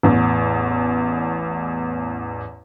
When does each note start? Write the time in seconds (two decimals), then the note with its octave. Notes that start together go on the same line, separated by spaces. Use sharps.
0.03 A1 E2